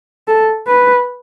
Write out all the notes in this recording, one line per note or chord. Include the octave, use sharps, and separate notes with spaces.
A4
B4